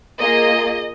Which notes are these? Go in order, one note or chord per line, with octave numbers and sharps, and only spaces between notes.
A#3 F4 G#4 D#5